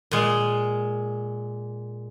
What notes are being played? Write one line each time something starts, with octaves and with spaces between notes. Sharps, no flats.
A#2 G#3